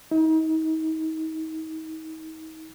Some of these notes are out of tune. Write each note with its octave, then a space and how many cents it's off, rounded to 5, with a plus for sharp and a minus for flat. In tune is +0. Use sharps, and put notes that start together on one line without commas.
D#4 +35